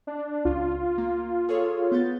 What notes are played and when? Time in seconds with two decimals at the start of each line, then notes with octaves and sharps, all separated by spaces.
0.07 D4
0.45 C#2 F4
0.98 A#3
1.49 G#4 A4 C#5
1.92 B3 G6 A6